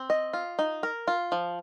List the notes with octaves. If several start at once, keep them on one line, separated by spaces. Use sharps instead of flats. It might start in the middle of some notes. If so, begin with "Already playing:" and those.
Already playing: C4
D#5
F4
D#4
A#4
F4
F3